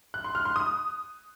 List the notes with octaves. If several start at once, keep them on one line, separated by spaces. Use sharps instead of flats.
F#6
C6
F6
C6
D#6